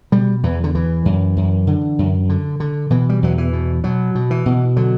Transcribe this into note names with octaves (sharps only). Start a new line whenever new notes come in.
B2 G3
E2 E3
D3
E2 E3
F#2
F#2
D3
F#2
D3
D3
B2 E3
G3
E2 F#3
E3
B2
B2 F#3
B2
E3
B2
D3 F#3